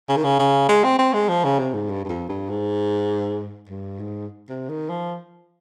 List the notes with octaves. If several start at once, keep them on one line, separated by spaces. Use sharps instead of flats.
C#3
D#3
C#3
C#3
G#3
C4
C4
G#3
F3
C#3
C3
G#2
G2
G2
F2
G2
G#2
G2
G#2
C3
D#3
F3